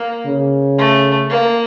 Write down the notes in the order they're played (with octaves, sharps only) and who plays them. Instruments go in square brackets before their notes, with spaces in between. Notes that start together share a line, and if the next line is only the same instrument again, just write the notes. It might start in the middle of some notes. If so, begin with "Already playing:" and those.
Already playing: [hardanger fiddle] A#3
[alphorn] C#3
[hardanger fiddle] A3
A#3